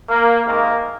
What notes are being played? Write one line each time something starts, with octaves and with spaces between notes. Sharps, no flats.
A#3
C3 D#3 G#3 A#3